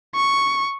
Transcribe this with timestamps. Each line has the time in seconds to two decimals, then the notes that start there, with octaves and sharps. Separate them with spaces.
0.16 C#6